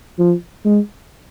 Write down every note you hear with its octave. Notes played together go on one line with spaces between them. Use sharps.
F3
G#3